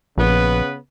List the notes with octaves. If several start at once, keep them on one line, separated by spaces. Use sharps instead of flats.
A#1 C#3 B3 B4